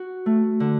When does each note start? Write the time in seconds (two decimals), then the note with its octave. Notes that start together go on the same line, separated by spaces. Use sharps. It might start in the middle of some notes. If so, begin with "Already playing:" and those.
Already playing: F#4
0.26 A3
0.60 D3